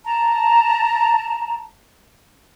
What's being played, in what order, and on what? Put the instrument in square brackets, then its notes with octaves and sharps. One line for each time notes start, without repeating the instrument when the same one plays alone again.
[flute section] A5 A#5